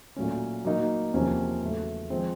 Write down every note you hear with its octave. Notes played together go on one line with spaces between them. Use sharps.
A#2 F#3 A3 C#4
F#3 A#3 D#4
E2 C3 F3 A#3 C#4
E2 C#3 F#3 A3
F3 G#3 C4